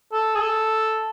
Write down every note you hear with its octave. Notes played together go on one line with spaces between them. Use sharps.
A4
G#4
A4